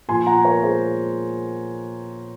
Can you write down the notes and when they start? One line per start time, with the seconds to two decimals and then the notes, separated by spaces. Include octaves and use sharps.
0.08 A#2 F3 G#5 C6
0.26 F#5 A#5
0.45 A#4 C#5
0.63 G#4 C5